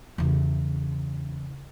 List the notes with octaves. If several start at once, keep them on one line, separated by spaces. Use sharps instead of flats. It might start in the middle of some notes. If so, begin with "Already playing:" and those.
E2 C#3